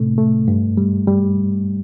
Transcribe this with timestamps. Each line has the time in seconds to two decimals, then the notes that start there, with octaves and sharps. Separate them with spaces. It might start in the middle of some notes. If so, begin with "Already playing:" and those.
Already playing: A2 C3 A3
0.18 A3
0.48 G2
0.77 G3
1.08 G3